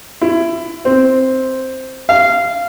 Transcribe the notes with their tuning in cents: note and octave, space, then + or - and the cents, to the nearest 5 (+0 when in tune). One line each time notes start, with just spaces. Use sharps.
E4 +20
C4 +0
F5 -15